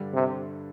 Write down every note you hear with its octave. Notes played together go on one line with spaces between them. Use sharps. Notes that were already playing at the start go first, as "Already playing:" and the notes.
Already playing: G2 D3 G3 D4
C3